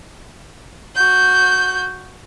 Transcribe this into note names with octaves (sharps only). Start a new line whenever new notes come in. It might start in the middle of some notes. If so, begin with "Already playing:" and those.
F#4 G6